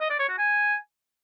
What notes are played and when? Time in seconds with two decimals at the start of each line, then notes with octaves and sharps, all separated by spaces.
0.01 D#5
0.10 D5
0.19 C#5
0.29 F#4
0.38 G#5